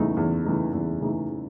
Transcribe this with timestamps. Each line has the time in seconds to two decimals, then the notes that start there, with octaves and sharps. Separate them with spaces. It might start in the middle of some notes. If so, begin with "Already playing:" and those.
Already playing: E2 C#3 E3 A3 D#4
0.17 E2
0.45 C#3 E3 A3 D#4
0.73 E2
1.01 C#3 E3 A3 D#4